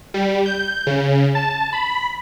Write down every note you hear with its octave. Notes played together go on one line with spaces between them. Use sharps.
G3
G6
C#3
A5
B5